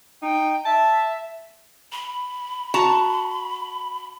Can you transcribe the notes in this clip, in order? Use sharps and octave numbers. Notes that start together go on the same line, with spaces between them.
D#4 G5
E5 A5
B5
F#4 A5 A#5